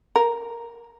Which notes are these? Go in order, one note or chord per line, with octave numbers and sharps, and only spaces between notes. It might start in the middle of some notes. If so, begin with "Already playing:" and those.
A#4